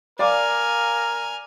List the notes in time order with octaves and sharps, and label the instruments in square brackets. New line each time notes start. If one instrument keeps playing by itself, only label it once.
[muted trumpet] A#4 [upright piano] D5 F5 D6 [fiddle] G#5 F6